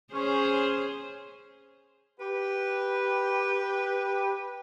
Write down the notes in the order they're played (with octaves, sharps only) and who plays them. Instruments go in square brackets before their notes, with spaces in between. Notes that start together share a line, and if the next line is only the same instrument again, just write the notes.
[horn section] C#4 [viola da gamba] G#4 C5
[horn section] G4 B4